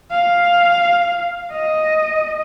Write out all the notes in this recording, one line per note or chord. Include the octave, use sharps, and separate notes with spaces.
F5
D#5